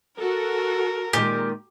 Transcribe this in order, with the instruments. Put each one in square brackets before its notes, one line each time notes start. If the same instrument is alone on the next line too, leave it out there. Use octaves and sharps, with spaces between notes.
[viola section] F#4 A4 [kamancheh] A#4
[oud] A#2 D#3 G#3 [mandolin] G4